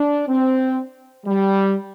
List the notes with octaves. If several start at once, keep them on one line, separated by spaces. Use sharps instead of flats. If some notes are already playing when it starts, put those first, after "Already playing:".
Already playing: D4
C4
G3